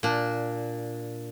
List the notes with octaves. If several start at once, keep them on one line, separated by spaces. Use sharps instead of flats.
A#2 D4